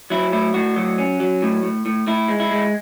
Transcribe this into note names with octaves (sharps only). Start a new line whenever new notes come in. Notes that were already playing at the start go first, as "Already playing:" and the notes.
F#3 E4
A2 E4
A2 F#4
F#3
C#4
F#3
A2
A2
A2
A2 E4
G#3
E4
G#3